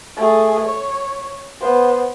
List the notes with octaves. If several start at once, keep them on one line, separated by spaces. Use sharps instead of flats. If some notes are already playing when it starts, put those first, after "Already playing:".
A3 G#4
C#5
B3 C5